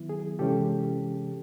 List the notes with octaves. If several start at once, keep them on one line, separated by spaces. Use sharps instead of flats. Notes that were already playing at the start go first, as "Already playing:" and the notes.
Already playing: D#3 F#3 B3 E4
G#4
C3 E3 G#3 C#4 G4 A4